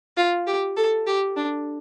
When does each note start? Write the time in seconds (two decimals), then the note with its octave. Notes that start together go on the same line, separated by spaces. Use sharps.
0.17 F4
0.47 G4
0.77 A4
1.07 G4
1.37 D4